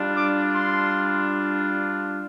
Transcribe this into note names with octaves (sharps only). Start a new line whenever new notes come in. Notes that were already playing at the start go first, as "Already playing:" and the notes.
Already playing: G3 D4 F4
D6
C6